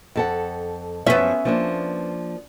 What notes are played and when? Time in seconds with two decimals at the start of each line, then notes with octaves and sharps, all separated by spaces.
0.16 F2 A4 F#5
1.06 F#2 F3 B3 C#4 E5
1.45 F3 A#3 D4